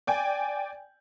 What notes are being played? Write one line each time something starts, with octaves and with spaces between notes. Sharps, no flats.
D5 G5 G#5